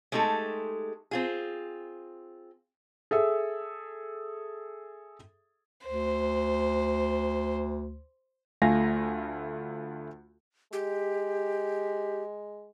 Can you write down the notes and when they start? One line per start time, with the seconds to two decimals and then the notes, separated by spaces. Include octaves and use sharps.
0.12 G#3 A3 D#4 G4 A4
1.11 C4 F4 G#4
3.11 G#4 A4 E5
5.87 D2 C5
8.62 D2 A3 F4 F5 G#5 A#6
10.73 G#3 G4